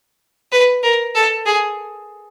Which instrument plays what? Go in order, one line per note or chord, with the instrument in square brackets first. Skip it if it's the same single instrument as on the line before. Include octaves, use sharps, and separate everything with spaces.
[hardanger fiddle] B4
A#4
A4
G#4